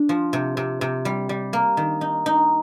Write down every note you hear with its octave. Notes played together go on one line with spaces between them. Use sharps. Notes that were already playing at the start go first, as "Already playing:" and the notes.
Already playing: D4
F3
C3
C3
C3
G3
G3
A#3
D#3
D#4
D#4